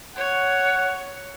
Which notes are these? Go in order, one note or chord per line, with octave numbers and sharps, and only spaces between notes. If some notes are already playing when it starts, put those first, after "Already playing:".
C#5 F#5